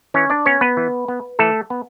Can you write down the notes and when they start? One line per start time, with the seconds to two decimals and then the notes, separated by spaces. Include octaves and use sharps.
0.14 E3 C#4 C#5
0.30 D4 D5
0.46 B3 C#4 C#5
0.61 B3 B4
0.77 E3
1.08 B3
1.39 E3 A3 A4
1.70 B3